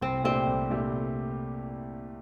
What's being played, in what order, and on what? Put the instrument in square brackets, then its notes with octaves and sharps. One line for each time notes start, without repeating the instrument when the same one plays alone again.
[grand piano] C2 [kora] C4
[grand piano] A#2 A3 D4 G4 [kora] C4
[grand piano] C2
A#2 A3 D4 G4
C2